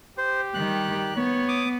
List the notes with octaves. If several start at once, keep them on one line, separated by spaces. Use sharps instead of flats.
G4 C5
D#3 G3 F#6
B3 C#5
D6 D#6